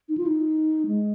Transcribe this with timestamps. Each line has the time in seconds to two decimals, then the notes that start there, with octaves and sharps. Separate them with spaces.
0.09 D#4
0.18 F4
0.26 D#4
0.87 G#3